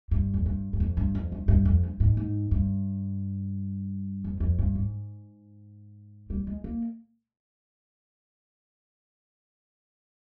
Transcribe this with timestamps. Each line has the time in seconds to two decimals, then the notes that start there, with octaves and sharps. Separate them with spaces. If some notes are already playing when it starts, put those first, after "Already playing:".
0.11 G2
0.34 F2
0.46 G2
0.73 G2
0.80 F2
0.97 G2
1.15 F2
1.32 G2
1.48 G2
1.65 F2
1.83 G2
2.00 G#2
2.17 G#2
2.51 G2
4.24 F2
4.40 F2
4.59 G2
4.75 G#2
6.30 G3
6.47 G#3
6.64 A#3